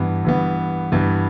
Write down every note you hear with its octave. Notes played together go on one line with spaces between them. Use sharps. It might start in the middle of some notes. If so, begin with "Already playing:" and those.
Already playing: G2 E3 B3
G2 E3 B3
G2 E3 B3